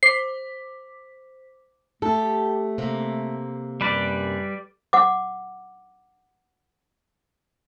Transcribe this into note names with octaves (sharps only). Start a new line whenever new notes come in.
C5 D6 B6 C7
A3 G4 A4
C3 A#3
F#2 G3 B4 D5
F#5 D6